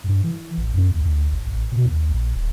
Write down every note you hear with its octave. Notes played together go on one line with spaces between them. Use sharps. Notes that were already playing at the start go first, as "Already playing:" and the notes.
G2
E3
A1
F#2
D#2
D2
G#1
A1
B2
D#2
A#1
D#1